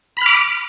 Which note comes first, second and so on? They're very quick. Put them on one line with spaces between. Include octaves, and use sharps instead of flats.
B5 F6 D6